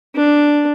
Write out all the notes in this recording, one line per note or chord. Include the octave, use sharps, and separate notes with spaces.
D4